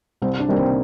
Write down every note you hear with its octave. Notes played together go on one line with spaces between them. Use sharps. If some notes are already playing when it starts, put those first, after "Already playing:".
C2 C4
D4
C3 D#3 G3 A#3
C4